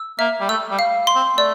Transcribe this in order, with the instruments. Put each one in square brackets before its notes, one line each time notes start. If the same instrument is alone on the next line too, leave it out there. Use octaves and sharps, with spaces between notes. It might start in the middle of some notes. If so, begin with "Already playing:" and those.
Already playing: [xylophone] E6
[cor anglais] A#3 [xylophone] E5
[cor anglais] G3
[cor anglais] A3 [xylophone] E6
[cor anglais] G3
[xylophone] F5
C6
[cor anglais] C4
[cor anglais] A3 [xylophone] D5